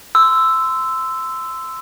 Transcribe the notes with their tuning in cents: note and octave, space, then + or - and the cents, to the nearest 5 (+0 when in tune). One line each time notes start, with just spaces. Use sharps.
C6 -20 E6 +0